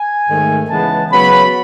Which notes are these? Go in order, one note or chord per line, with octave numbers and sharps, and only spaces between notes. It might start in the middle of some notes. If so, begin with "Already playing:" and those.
Already playing: G#5
G#2 D#3 A3
C#3 E3 G#3 B3 A5
C#3 F#3 B3 B5